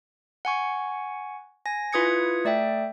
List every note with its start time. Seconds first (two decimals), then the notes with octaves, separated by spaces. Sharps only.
0.45 F#5 G#5 C#6
1.66 G#5 A#6
1.93 E4 F4 B4 D#6 G#6 C#7
2.45 A3 D5 E5 G5